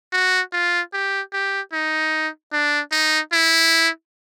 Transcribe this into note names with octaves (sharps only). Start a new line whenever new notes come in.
F#4
F4
G4
G4
D#4
D4
D#4
E4